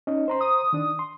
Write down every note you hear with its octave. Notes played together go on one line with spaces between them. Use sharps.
C#4 D#4 D#5
C5 A#5 C6
D#6
D#3 D4
C6